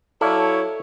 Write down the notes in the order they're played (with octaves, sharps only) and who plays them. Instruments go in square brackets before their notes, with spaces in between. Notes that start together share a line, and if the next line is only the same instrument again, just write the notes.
[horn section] F#3 E4 C#5 [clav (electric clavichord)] A4 D5 F5